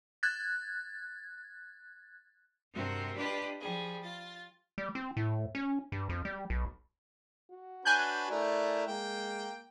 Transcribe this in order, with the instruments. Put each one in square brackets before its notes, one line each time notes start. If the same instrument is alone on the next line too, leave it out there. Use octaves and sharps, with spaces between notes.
[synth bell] F#6 G#6 A6
[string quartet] G2 C3 C4 F#4 A#4
D4 F4 G4 B4 D5 D#5
F3 G3 G#4
F4 A6
[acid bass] G3
C4
A2
C#4
G2
F2
G3
B1
[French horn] F#4
[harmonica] D4 B4 C#5 [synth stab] G#5 F#6 G6
[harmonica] A3 E4 A#4 [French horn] D5
[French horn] G#3 [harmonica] A#3 G5